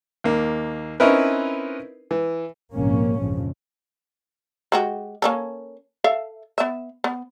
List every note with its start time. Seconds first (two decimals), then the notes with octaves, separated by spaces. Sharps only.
0.24 D#2 A#3
1.00 C4 C#4 D#4 E4 A#4 B4
2.11 E3
2.73 A#1 F2 G#2 C3 A#3 C#4
3.18 A#1 F2 C#3 F3
4.72 G#3 F#4 G4
5.22 A#3 C#4 A4
6.04 A4 E5 F5
6.58 B3 E5
7.04 B3